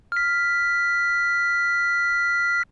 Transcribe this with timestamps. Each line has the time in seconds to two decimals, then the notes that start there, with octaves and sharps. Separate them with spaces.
0.12 F6 B6